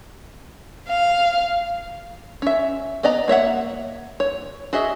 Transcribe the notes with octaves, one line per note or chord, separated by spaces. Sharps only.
F5
C#4 E5
B3 D5 D#5 A#5
A#3 C#5 E5 F#5
C#5
F#4 G#4 D#5 E5